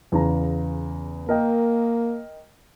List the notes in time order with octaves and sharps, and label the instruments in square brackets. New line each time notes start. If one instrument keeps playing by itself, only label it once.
[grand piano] E2 C#3 A#5
[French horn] A#3 [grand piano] A#4 D#5 G5